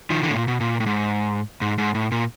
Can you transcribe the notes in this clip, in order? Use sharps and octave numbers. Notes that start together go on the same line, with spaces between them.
D#3 F3
D3 E3
A2
A#2
B2
A#2
A2
G#2
G#2
G#2
A2
A#2